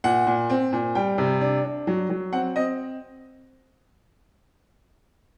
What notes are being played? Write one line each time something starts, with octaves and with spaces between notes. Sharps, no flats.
A#2 F#5
A#2
C4
A#2
G3 G5
C3
D4
D4
F#3
F#3
C4 F#5
C4 D#5